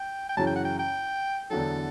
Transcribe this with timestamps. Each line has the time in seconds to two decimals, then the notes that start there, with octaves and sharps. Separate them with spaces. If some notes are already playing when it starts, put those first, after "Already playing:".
Already playing: G5
0.29 G5
0.37 F#2 C#3 E3 A5
0.47 G5
0.56 F#5
0.65 G5
0.79 G5
1.50 E2 D3 F#3 A4